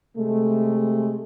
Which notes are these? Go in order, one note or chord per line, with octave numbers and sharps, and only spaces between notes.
C3 G#3 A3